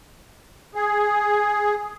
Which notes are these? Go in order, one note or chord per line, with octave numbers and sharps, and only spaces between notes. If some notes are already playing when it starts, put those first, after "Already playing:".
G#4